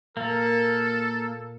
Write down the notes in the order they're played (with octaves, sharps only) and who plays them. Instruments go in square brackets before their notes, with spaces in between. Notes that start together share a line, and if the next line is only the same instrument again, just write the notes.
[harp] A#2 [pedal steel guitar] A#3 [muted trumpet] A4